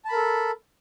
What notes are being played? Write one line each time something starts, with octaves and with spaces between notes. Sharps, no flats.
A4 A#4 A5 B5